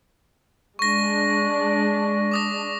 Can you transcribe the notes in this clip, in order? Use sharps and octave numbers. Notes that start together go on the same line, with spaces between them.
G#3 D4 C#6 A#6
D6 D#6 A#6